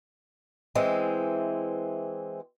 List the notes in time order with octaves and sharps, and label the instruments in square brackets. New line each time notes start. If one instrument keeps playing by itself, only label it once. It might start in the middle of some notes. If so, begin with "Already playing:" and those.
[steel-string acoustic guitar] E3 G#3 C4